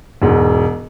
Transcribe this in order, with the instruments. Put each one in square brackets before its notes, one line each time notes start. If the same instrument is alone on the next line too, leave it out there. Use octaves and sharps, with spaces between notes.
[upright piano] E1 G#2 F#4